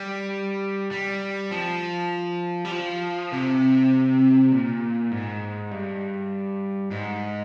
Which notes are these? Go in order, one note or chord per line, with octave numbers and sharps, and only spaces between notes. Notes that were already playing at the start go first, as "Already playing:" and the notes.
Already playing: G3
G3
F3
G3
F3
C3
A#2
G#2
G2
G#2